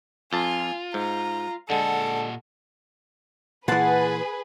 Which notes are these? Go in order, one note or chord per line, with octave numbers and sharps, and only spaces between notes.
F2 F4 G#5 A5
G#2 A#5
A#2 D3 G#3 A4 F#5
A#2 E3 G#4 B4 F#5 A5 C6